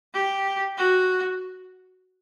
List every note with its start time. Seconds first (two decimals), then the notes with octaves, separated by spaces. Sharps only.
0.14 G4
0.77 F#4